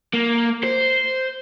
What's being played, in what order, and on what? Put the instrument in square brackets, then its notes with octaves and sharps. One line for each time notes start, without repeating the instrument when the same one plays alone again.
[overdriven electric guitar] A#3
C5